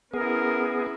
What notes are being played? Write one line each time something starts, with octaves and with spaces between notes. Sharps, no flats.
B3 C#4 E4 G#4 A#4